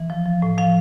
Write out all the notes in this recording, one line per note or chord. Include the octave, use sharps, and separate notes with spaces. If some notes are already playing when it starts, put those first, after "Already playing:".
Already playing: E3
F3
F3
A2
F3 F5